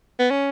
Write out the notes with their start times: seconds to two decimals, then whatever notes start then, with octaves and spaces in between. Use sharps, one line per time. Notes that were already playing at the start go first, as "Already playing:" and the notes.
0.19 B3
0.31 C#4